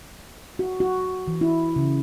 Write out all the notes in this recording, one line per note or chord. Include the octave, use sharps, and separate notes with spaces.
F#4
F#4
E3
E4
C#3